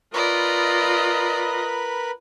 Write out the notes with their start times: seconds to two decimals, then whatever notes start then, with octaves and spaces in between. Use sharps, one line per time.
0.14 F4 A#4 B4 D5 D#5 B5